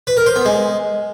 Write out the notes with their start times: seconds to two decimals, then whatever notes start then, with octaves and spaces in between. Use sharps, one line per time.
0.07 B4
0.17 A#4
0.26 C5
0.36 B3
0.45 G#3